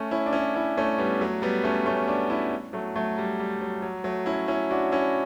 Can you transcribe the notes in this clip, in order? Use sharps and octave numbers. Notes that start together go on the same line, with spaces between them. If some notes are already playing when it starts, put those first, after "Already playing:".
Already playing: A3 C#4
C#4 E4
D4
C#4 E4
C#4 E4
A3 C#4
G3 B3
F#3 A3
G3 B3
A3 C#4
A3 C#4
B3 D4
C#4 E4
F#3 A3
F#3 A3
G3
G3
F#3
F#3
F#3 A3
C#4 E4
C#4 E4
D4 F#4
C#4 E4